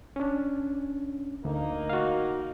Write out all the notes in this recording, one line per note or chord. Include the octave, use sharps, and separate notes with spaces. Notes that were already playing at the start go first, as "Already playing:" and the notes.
C#4 D4
D2 A#3 D#4
F#4 F5